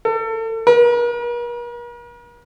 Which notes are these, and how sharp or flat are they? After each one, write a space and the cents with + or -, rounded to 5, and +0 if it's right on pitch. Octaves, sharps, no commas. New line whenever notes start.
A4 +35
A#4 +45